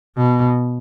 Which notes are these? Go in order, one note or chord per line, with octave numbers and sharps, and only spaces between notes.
B2